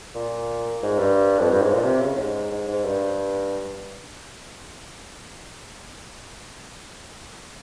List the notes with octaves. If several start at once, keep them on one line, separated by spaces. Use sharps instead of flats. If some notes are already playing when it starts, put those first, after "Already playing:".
A#2
G#2
G2
F2
G2
G#2
A#2
C3
C#3
G#2
G#2
G#2
G2